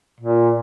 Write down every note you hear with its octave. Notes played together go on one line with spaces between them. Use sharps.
A#2